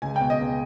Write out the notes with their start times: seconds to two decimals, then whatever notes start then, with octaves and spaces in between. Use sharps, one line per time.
0.02 C#2 G#5
0.16 B2 G5
0.30 D#5
0.39 C#2